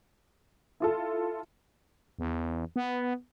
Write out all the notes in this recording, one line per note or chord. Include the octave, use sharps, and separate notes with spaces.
E4 F4 A4
E2
B3